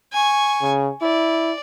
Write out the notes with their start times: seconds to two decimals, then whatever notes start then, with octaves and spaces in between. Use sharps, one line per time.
0.13 G#5 C#6
0.62 C#3
1.02 E4 D5